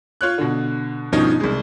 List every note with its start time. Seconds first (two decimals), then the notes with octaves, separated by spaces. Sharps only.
0.21 F4 C#5 F#6
0.38 B2 D3
1.12 G2 B2 D#3 F3 C#4 D#4
1.40 C2 G#3